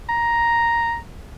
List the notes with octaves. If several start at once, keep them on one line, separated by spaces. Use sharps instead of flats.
A#5